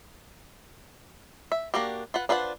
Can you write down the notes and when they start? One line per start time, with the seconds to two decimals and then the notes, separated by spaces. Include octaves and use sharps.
1.52 E5
1.74 A#3 D4 F#4 G4
2.14 F4 B4 F#5
2.29 D4 F4 B4 C5 F#5